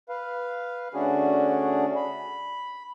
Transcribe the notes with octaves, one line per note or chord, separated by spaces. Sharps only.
B4 F5
D3 A3 C#4 D4 F#4 G#4
B5